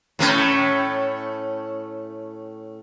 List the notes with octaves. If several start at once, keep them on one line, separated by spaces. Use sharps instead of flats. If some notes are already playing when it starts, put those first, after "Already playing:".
A2 A3 C#4